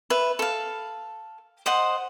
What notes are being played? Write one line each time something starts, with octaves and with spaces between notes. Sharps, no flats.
B4 E5
A4 F5
C5 D#5 F#5